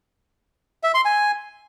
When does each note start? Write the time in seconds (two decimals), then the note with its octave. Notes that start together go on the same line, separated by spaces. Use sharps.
0.83 E5
0.94 C6
1.05 G#5